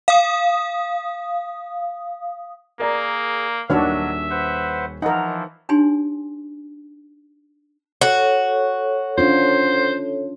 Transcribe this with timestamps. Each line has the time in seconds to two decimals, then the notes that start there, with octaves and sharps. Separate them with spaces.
0.08 F5 D#6
2.80 A#3 G#4 A#4 D5 A#5
3.70 D#1 D#3 F#3 D4 F#4 C#5 E5 F6
4.30 B4 C5 F#5
5.02 E3 F3 D#4 A#4 F#5
5.69 D4 D#4 G4 C#5 G#5 C6
8.01 F#4 A4 C#5
9.18 C#4 D4 F4 C5